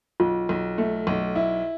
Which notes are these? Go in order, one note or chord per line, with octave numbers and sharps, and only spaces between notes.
B1 F4
B1
A3
B1
E4